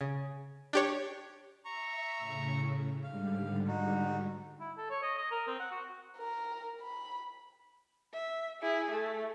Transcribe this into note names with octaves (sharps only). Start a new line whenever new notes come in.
C#3
D4 G4 C#5
E5 A#5 C#6
A2 C#3
G#2 D3 G3 F5
D#4 F#4
E4
A4
C#5
D#5
D#5
A#4
C4
F#5
F#4
A#4
B5
E5
E4 G#4
A3